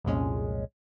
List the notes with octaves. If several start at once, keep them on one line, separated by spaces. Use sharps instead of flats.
C2 F2 A#2 G#3 C#4